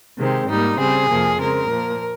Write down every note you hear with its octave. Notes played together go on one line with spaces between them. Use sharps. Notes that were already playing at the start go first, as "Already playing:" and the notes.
C3 D#3 G#3 C4
G#2 G3 A#3 D#4
C#3 G3 C4 G#4
F2 C3 F3 A#3
C#3 G#3 C4 A#4
A#2 F3 A#3